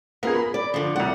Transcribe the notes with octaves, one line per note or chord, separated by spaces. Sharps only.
B3 F4 G#4 A#4
B5
D5
D3 F3
C2 D5 F#5